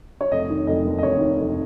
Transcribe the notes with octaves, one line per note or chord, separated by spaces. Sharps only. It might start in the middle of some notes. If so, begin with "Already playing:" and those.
C#5
F1 D#5
D#3
F1 D#5
D#2
D#5
F1 C#5
D#3
F1